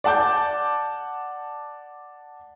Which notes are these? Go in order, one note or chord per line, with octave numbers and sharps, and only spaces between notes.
D5 F#5 A5 D6 G6